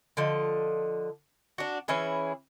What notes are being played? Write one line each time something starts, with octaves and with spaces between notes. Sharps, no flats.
D3 F3 D#5
D4 F#4
E3 C#4 E4 G#4